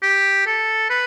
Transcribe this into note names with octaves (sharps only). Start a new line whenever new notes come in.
G4
A4
B4